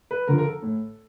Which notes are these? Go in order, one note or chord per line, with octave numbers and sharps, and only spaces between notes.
B4
D3 F3 A#4
A#4
A4
A2